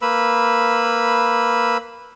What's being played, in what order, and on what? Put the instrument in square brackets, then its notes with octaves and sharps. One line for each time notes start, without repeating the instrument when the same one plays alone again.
[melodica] A#3 B4 B5 E6